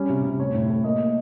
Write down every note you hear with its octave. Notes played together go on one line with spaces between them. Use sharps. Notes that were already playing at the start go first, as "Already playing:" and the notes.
Already playing: G3 C#4
C3
C3
A2 C#5
A2
A3
A#3 D#5
A#3